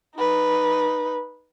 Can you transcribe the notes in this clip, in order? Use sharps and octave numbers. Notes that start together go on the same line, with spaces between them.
D#4 B4